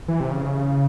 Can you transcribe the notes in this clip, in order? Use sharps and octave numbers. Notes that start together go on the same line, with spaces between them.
E3
C3
C#3